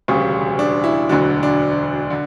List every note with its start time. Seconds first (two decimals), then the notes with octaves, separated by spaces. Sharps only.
0.08 E1 D2 C#3 G3 C#4
0.59 D4
0.84 E4
1.09 E1 D2 D3 F#3 D4
1.43 D4
2.10 D3